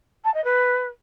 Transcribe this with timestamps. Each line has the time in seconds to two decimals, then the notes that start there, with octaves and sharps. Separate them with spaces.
0.24 A5
0.34 D#5
0.44 B4